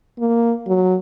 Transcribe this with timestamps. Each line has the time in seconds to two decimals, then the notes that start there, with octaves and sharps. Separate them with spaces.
0.19 A#3
0.68 F#3